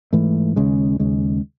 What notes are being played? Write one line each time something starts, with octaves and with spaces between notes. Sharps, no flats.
G#2 E3 A3
D#2 C#3 G#3
D#2 C#3 G#3